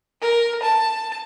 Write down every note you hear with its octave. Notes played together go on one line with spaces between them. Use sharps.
A#4
A5